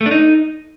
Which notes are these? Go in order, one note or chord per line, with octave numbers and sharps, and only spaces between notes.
A3
D4
D#4